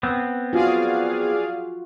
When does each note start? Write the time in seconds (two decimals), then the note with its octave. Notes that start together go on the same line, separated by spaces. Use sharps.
0.03 B3 C4
0.53 F4 F#4 G#4 D5 F5